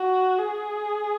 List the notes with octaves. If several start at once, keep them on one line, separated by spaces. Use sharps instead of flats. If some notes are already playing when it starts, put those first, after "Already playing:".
Already playing: F#4
G#4